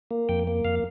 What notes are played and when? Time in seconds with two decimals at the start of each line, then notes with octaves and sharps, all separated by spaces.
0.11 A#3
0.29 F2 G5
0.47 A#3
0.65 F2 F5